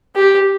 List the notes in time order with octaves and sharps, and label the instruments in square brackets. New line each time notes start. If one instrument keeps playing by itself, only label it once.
[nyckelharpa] G4